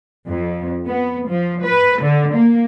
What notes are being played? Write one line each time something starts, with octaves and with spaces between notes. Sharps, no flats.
F2
B3
F3
B4
D3
A#3